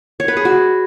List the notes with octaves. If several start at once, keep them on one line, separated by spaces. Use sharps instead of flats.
C#5
B4
G#4
F#4